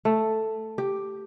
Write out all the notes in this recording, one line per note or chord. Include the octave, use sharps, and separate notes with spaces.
A3
G4